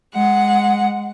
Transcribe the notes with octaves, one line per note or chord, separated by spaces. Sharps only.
G#3 F#5